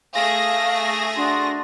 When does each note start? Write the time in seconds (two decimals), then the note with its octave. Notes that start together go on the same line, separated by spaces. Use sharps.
0.14 A3 G#4 F5 A#6
1.15 D4 F#4 C6